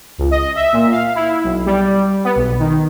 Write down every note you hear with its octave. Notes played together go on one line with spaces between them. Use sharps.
C#2
D#5
E5
A#2
F5
E4
B1
G3
B3
B1
D#3